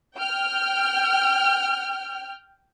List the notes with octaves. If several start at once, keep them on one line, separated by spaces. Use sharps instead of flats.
G5 F6